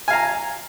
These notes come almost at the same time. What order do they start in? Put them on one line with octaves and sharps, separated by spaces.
G#5 F5 A#5